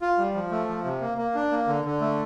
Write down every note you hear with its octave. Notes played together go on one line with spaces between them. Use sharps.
F4
G3
F3
A3
F3
C3
A#3
A#3
D4
A#3
D3
D3
A3